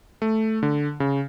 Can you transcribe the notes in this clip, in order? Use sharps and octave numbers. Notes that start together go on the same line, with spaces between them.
A3
D3
C#3